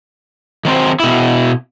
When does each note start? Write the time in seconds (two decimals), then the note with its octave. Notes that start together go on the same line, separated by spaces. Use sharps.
0.65 D#3 F#3 C4 C5
1.00 B2 E4